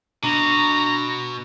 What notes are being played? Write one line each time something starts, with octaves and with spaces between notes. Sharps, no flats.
B2 D4 A#5